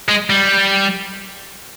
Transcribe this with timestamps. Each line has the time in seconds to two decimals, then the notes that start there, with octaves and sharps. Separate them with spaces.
0.09 G#3
0.30 G3